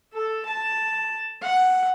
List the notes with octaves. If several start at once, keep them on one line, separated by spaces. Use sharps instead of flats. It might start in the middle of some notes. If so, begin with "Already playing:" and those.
A4
A5
F#5